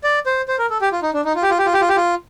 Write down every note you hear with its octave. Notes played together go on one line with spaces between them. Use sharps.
D5
C5
C5
A#4
A4
G4
F4
D#4
D4
D#4
F4
G4
F4
G4
F4
G4
F4
G4
F4